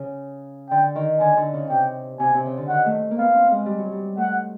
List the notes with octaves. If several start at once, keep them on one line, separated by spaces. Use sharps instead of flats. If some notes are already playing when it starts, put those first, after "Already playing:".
Already playing: C#3
D3 G5
D#3
D3 G#5
D3
C#3
C3 G5
C3 G#5
C3
C#3
D3
D#3 F#5
A3
A#3
B3 F5
C4
G#3
G3
F#3
G3
A3 F#5